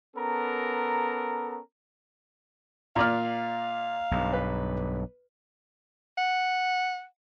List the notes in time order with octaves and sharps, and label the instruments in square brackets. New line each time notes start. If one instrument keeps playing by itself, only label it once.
[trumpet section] B3 C#4 A4 A#4 A#5
[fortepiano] A#2 A#3 D5 [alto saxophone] F5 [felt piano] A#5 F6
[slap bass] B1 G2
[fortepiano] B4
[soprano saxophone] F#5